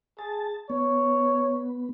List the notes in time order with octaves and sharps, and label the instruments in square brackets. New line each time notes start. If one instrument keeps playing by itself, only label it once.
[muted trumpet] G#4 [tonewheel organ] A5
[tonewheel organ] B3 [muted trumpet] C#5